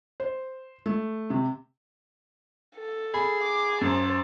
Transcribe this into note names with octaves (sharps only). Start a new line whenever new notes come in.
C5
A3
C3
A4
G#4 B5
D6
F#2 C5 A5